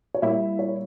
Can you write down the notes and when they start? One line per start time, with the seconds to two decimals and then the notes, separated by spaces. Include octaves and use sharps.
0.14 C#5
0.22 A#2 G3 A#3 E4 E5
0.59 C#5